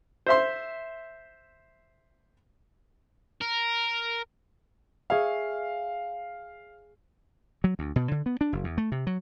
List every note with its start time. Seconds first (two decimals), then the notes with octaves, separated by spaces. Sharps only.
0.26 C5 E5 C6
3.41 A#4
5.10 G#4 C#5 E5 F5
7.64 F#3
7.79 D2
7.96 B2
8.11 D3
8.26 B3
8.41 D4
8.53 F#1
8.64 E2
8.78 A3
8.92 C3
9.07 F#3